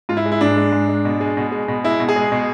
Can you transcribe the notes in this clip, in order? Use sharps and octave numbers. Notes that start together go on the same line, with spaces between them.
G#2 F4
E4
G#3
E4
G#2 D4
G#3
G#2
G#3
B2
G#3
B2
G#3
B2
G#3 E4
B2
G#4
G#3
B2